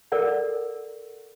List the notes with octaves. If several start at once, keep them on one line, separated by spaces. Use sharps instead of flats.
A4 A#4 D5 F#5